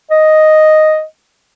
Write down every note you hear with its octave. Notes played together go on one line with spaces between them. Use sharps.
D#5